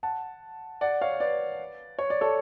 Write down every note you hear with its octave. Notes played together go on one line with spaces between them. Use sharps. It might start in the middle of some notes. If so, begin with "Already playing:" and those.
F#5 A5
D5 F#5
C#5 F5
B4 D5
C#5
D5
A4 C#5